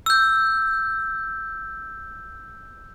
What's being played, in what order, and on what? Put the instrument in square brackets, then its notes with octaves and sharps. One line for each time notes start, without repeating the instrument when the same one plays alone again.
[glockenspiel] E6 G6